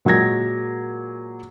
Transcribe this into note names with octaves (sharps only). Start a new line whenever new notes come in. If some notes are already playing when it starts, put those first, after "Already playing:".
A#2 F#3 G#3 G#6 A#6